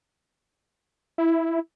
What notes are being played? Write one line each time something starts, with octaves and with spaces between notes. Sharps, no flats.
E4